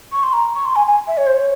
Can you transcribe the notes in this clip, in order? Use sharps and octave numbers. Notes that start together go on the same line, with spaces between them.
C#6
C6
A#5
C#6
C6
G#5
G#5
E5
C#5
C5
C#5